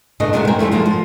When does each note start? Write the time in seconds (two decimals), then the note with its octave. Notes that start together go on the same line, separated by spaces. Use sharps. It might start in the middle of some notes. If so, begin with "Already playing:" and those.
0.20 A2 C#3 A3 D4 B4 D#5
0.33 A#2 C#3 F#3 G#3 A3 B3
0.47 A#4 C5 G5 G#5
0.59 F3 G3 A3 E4
0.72 D3 F3 G#3 A#3
0.86 F3